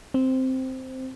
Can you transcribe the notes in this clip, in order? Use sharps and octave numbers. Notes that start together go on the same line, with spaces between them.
C4